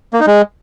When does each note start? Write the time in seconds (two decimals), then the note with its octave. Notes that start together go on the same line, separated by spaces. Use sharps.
0.13 A#3
0.20 D#4
0.27 G#3